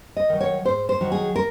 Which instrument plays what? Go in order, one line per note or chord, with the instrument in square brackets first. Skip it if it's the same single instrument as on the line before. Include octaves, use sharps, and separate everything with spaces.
[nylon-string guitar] D#5
D#3 F#3
C#5
G#2 C5
C5
D#3 F#3
G#4
A#4